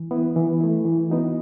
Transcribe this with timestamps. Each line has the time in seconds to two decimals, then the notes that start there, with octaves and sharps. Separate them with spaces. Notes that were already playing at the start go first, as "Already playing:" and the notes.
Already playing: E3
0.11 B3 E4
0.36 E3
0.61 A3 E4
0.85 E3
1.10 B3 D#4 F#4